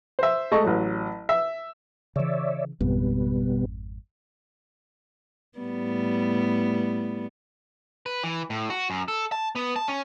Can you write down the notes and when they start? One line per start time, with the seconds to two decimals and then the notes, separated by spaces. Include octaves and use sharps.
0.19 C5 E5
0.52 G#3 A3 D#5 A5 C#6
0.64 A1 F#3
1.29 E5
2.16 C#3 E3 C#5 D5 E5
2.81 G#1 F2 B2 G3 B3
5.59 A2 G3 B3
8.06 B4
8.24 E3
8.50 A2
8.70 F#4
8.90 F#2
9.08 A4
9.32 A5
9.55 B3
9.76 A5
9.88 C#4